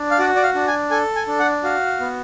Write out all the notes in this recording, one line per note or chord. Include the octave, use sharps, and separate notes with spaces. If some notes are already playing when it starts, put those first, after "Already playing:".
Already playing: D4
F5
F#4 D5
D5
F5
D4
G#5
A4 G#5
G#5
D4
F#5
F#4 F5
B3